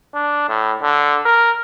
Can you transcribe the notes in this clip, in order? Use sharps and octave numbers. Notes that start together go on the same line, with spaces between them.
D4
A2
D3
A#4